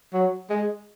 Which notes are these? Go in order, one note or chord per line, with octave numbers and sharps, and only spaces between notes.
F#3
G#3